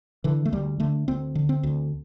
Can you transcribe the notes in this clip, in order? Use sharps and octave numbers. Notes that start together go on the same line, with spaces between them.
D3 E3
A3
D2 G3
D3 A3
D2 C4
D3
C4
D2